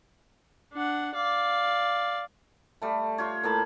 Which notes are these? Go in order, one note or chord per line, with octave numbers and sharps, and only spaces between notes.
D4 F#5
D5 F5
G3 A3
F4 C5 C#5
A2 A#3 A5 B5